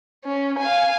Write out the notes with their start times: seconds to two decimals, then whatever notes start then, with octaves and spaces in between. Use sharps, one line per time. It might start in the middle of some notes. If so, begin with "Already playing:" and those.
0.24 C#4
0.59 F5 G#5